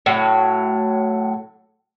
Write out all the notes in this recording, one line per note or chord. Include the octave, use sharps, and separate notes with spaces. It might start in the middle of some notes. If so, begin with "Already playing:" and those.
A2 F#3